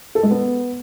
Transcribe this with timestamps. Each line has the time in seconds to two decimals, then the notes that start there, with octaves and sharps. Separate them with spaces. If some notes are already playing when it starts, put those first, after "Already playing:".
0.15 A4
0.23 G#3
0.31 B3